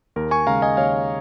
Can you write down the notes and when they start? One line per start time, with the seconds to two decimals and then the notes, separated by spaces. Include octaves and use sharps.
0.16 D#2 A#4
0.31 G#5 C#6
0.47 C#3 G#3 F5 A#5
0.62 D#5 G#5
0.77 D#2 C#5 F5